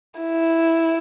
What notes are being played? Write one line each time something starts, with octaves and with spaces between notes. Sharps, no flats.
E4